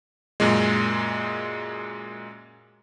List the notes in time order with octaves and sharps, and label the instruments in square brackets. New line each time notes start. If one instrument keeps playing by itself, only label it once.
[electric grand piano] F#2 A#2 G#3